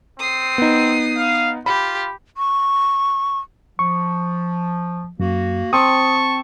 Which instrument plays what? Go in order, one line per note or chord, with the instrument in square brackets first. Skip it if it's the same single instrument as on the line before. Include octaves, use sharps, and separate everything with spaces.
[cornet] C4 [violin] D#6 C7
[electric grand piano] B3 D#4
[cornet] F5
[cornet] F4 [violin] G4 [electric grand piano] B5
[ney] C#6
[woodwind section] F3 [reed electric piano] C#6
[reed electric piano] F#2 [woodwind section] A#3 F#4
[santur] C4 [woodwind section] A5 C#6 [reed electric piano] D#6